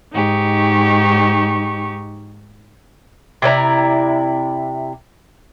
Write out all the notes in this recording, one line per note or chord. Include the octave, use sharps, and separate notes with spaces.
G#2 D#4 G4 C#6
C3 E4 D5 A#5